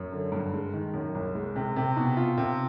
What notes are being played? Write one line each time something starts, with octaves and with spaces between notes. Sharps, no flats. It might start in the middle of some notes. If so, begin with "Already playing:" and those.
Already playing: F#2
D3
G2
G#3
D#3
F#2
C2
G#3
C3
C3
B2
F4
C3